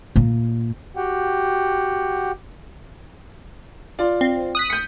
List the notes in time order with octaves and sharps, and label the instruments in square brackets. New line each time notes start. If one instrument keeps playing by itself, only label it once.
[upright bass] A#2
[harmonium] F#4 G4 F#5 G5
[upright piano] F4 D5
[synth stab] C4
D#6 F#6 B6
[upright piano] G6 C#7